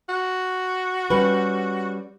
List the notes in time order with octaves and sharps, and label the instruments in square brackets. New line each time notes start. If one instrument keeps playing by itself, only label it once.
[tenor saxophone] F#4
[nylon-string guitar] G3 C#4 B4